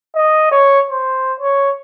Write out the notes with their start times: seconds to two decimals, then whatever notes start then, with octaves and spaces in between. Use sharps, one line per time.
0.16 D#5
0.52 C#5
0.91 C5
1.40 C#5